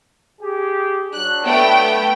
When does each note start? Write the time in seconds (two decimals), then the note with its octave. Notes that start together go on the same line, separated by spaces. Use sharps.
0.41 G4 G#4
1.13 F#3 D4 F#6
1.44 A3 B3 G5